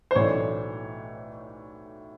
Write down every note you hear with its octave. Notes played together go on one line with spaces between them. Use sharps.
C5
B1 A2 E3 A3 D4 C#5